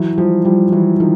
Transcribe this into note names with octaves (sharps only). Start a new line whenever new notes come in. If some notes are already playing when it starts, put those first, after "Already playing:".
Already playing: E3 F#3
F3 G3
F3 G3
E3 F#3
D#3 F3